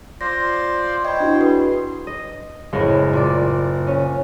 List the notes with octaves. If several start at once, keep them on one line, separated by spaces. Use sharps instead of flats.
F4 C5 D5 A#6
C5 C#5 D#5 G5 B5
D4 E4 F#4
G#4 B4 C6
D#5
F#1 A2 G#3
A#2 D5
C#4